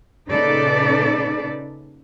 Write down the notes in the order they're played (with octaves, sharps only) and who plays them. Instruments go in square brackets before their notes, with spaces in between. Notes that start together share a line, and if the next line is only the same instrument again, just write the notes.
[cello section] A#2 C#3 D#4 A4 B4 D5